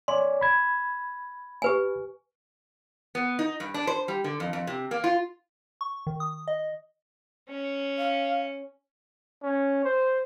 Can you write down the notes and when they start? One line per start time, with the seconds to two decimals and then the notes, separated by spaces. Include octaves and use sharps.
0.08 C#5 D5 G#5 C6
0.41 B5 G#6
1.62 G4 B4 G#5
3.15 B3
3.39 D#4
3.60 G2
3.74 D4
3.87 C5
4.08 G3
4.24 D3
4.40 F2
4.53 F2
4.67 C3
4.91 A#3
5.04 F4
5.81 C#6
6.07 D#3
6.20 D#6
6.48 D#5
7.49 C#4
7.98 F5
9.42 C#4
9.85 C5